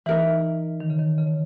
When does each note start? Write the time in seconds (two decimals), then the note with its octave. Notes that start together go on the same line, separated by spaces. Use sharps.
0.06 E3 D#4 A#4 E5
0.80 D#3
0.90 C#3
0.99 D#3
1.18 C#3